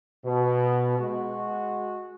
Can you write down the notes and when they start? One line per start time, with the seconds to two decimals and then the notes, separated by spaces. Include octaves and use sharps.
0.24 B2
0.98 G#3 F#4